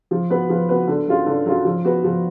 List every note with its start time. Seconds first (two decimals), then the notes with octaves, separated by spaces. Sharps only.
0.11 F3
0.30 B3 F#4 B4
0.49 F3
0.69 B3 F#4 B4
0.88 D3
1.08 F#3 C#4 F4
1.26 D3
1.46 F#3 C#4 F4
1.65 F3
1.85 B3 F#4 B4
2.04 F3